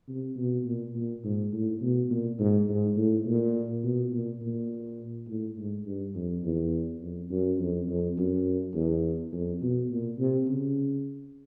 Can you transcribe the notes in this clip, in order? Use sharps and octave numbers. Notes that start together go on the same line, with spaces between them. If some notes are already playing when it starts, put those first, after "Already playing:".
C3
B2
A#2
A#2
G#2
A2
B2
A#2
G#2
G#2
A2
A#2
B2
A#2
A#2
A2
G#2
G2
F2
E2
F2
F#2
F2
F2
F#2
E2
F2
B2
A#2
C3
C#3